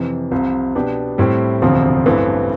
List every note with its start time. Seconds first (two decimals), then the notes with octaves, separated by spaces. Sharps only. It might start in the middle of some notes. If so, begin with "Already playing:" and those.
Already playing: F2 C3 E3
0.31 C2 C3 F3
0.75 B2 B3 D4 G4
1.18 A2 G3 C4 E4
1.62 E1 D2 C3 F3 C4
2.06 A1 G2 E3 A3 C4